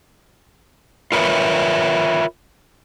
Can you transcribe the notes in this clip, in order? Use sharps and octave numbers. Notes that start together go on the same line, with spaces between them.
F4 A#4 B4 C#5 E5